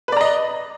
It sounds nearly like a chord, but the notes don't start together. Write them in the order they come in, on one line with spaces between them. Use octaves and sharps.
B4 D5 A#5 D#5